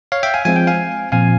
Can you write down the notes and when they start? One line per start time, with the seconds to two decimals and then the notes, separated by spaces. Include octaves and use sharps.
0.12 C#5 F5
0.23 E5 G5
0.34 F5 G#5
0.45 F3 G#3 C4 G#5
0.56 G5
0.67 F5 G#5
1.12 A#2 F3 C4 F5 G#5